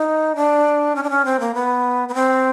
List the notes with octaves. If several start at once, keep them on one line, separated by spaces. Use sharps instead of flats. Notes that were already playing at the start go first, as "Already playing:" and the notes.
Already playing: D#4
D4
C#4
D4
C#4
C4
A#3
B3
B3
C4